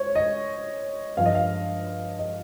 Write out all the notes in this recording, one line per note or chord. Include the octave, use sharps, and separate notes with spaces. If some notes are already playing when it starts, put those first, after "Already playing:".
Already playing: C5 C#5
D#5
G2 F3 F5
D#5
F5
D#5